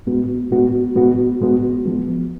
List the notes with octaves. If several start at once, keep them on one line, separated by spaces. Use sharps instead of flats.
A2 G#3 B3 F#4
A2 G#3 B3 F#4
A2 G#3 B3 F#4
A2 G#3 B3 F#4
F3 G#3 B3